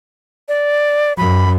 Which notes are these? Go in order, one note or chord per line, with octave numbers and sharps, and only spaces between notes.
D5
F#2 B5